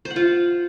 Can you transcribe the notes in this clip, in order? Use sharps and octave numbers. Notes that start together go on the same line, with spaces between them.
C5
F#5
F4